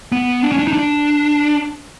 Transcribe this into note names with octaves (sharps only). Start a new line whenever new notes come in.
B3
D4
C#4
D4
D#4
D4